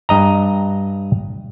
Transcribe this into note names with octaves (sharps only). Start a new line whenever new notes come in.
G2 D#5 A#5